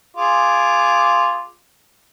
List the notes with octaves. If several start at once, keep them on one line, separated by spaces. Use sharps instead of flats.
F4 G#4 D6